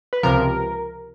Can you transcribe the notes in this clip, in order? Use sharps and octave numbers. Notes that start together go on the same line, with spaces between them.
B4
C#2 C3 F3 A#4